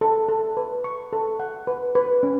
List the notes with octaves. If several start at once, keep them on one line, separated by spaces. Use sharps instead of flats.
A4
A4
B4
C#6
A4
F#5
B4
B4
C#4